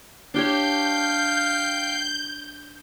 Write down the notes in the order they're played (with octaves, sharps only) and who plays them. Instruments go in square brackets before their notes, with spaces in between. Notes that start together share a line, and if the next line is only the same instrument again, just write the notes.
[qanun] D4 G4 C#5 [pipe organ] F5 G5 F6 [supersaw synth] G6